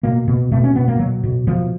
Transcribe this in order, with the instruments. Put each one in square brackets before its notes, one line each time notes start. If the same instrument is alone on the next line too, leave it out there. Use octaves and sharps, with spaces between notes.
[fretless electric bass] B2 A#3
B2
B2 A3
C#4
B2 B3
A#3
B2 F#3
B2
B2 F3